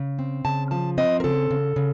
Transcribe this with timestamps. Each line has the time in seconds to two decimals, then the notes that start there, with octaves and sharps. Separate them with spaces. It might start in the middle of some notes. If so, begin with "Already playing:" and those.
Already playing: C#3
0.19 C4
0.45 C#3 A5
0.71 F3 A5
0.98 C4 D#5
1.20 A#4
1.24 C#3 A4
1.51 C#3
1.76 C#3